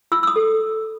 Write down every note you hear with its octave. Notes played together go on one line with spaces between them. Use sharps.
F4 E6
E6
D#6
A4